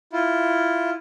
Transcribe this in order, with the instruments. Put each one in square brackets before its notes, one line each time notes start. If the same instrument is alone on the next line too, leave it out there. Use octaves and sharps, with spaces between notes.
[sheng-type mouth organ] E4 F4